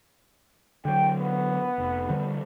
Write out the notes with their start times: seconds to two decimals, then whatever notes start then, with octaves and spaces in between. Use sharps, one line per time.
0.85 D3 F#3 G5
1.16 B3
1.78 F1
2.09 D3 F3 G3